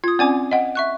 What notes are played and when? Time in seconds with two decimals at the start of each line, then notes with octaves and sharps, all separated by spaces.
0.04 F4 D#6 G#6
0.19 C4 C#4 D5 G#5 D6
0.51 D#5 F#5 G5
0.75 E5 C#6 F#6